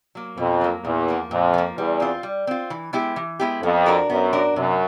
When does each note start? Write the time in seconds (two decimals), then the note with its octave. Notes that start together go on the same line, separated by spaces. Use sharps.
0.15 F#3 A#3
0.37 F2 B2
0.61 F#3 A#3
0.85 E2 A#2
1.08 F3 A#3
1.31 F2 A#2
1.54 F3 A#3
1.77 E2 G3
2.00 C4 F4
2.23 G3
2.47 C4 F4
2.70 E3
2.93 G#3 B3 E4 G4
3.16 E3
3.40 G#3 B3 E4 G4
3.62 F2 B3
3.86 D4 F#4 A#4
4.09 F#2 B3
4.33 D4 F#4 A#4
4.56 F#2 C3